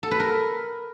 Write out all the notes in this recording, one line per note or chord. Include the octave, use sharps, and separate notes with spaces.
A4
B4
A#4